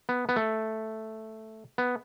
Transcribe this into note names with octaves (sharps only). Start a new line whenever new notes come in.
B3
B3
A3
B3